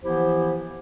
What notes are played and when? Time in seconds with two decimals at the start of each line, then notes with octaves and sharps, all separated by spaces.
0.03 E3 F3 B3 E4 G4 C5